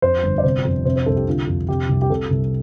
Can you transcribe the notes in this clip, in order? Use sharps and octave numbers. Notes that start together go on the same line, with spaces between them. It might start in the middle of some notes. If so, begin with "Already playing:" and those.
F2 C5
G1
D5
C3 C5
F2
C3 C5
C5
C2 A4
G4
D3 F4
F2
C3 G4
C2
G4
C3 A4
C2